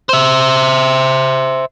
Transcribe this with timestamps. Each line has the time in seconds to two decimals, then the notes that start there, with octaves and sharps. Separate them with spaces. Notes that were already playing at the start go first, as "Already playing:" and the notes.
0.09 C5 E5